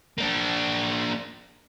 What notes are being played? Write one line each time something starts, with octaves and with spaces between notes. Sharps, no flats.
A#3 D4